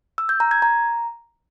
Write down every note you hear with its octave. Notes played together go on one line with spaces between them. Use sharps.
E6
G6
A#5
G#6
A#5